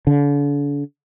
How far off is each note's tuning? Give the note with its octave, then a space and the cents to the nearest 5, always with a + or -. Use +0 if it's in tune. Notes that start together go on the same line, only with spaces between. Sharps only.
D3 -40